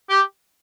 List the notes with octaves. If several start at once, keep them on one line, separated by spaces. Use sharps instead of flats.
G4